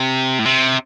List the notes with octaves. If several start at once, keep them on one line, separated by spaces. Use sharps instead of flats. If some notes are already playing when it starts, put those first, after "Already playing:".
Already playing: C3
A2
C3